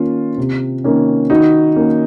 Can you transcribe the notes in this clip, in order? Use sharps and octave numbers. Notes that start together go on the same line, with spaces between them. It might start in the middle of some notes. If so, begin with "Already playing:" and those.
Already playing: D#3 A#3 C#4 F4
C3
D#3 A#3 C#4
D#3 D#4 F#4
A#3 C#4